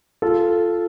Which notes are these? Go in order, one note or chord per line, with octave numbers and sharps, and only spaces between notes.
F4 A4